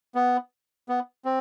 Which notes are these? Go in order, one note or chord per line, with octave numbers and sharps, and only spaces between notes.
B3
B3
C4